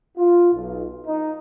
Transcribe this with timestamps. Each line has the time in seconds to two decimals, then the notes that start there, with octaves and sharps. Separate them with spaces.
0.18 F4
0.54 B1
1.06 D#4